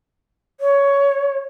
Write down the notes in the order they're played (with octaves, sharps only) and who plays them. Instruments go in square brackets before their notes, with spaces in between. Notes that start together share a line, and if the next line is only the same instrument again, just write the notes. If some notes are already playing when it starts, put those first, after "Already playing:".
[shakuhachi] C#5